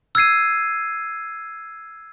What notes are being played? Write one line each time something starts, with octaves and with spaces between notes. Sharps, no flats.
E6 F6 G#6 C7 D#7